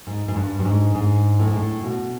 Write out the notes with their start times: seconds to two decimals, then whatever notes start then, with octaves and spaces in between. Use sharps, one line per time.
0.07 G#2
0.28 G#2
0.36 G2
0.59 G2
0.65 G#2
0.95 G#2
1.40 A2
1.48 G#2
1.56 A2
1.84 B2